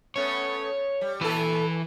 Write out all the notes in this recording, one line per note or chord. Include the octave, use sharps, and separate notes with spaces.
A3 B3 C#4 C#5
G3
A#2 E3 A4 B4